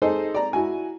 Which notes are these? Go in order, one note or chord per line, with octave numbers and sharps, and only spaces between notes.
D#4 G#4 A4 C5 D#5
D5 A#5
E4 F#4 G#5